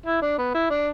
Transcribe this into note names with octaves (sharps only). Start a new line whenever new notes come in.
E4
D4
B3
E4
D4